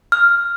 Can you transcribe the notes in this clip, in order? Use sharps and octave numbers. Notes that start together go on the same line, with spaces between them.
F6